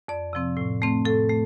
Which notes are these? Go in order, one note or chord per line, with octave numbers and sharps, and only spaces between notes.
F2 D5
C3 F3 C4
A2
A3 C4
A2 A4
A3